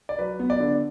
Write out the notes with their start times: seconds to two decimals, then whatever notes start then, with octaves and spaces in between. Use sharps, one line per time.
0.09 D5
0.19 F#3 B4
0.40 B3
0.50 D5
0.60 D3